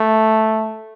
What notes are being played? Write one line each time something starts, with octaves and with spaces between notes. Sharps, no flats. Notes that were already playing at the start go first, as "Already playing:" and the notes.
Already playing: A3